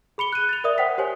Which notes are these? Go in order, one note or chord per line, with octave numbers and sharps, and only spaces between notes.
G#4 B5 C#7 G7
F#6 D#7
A6 F7
A#4 D5 E5 D#6
C5 F#5 G5 D#6 B6
G4 C5 C#5 G#5